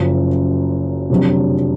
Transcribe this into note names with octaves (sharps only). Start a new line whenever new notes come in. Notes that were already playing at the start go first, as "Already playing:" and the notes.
Already playing: F#1 F#2 F3
F1 F2 D3 F#3